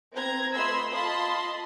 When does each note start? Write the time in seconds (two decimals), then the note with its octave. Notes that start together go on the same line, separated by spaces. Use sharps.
0.14 C4 B4 A#5 G#6
0.54 A3 F4 D#5 B5 C6 E6
0.92 F4 D#5 A5 B5 C6 D#6